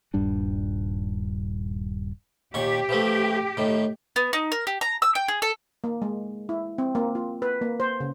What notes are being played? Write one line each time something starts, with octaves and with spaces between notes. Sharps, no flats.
D#1 G2 G3 D4
D#2 A#2 G4 C#6
E3 F3 A3
A2 D#3
B3
D#4
A#4
G4
A#5
E6
G5
G#4
A4
A#3
G#3
E4
C4
A#3
F4
B4
A#3
C5
C#3